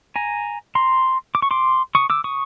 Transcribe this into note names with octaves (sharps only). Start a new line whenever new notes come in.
G#5 A#5
A#5 C6
D6
C#6
C6 D6
C#6 D#6
D6 E6
C#6 D#6